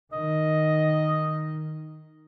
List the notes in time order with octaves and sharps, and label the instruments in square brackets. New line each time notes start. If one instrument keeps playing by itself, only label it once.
[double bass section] D#3 [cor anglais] D#5